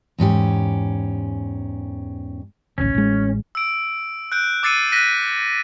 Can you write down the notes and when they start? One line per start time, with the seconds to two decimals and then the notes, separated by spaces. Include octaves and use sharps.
0.18 E2 G#2 C#4 G4
2.78 D1 A1 C#4
2.95 A1 G#3
3.55 E6 D7
4.32 F#6 G6 D7
4.63 D6 E6 A6 C7 C#7 D#7
4.92 F#6 A#6 B6 D#7